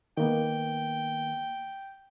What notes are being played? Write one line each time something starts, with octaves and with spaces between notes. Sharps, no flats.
D#3 A#3 B3 G5